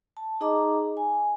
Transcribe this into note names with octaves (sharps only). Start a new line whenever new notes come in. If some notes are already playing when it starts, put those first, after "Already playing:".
A5
D#4 G#4 D#5 A#5 D6
G#5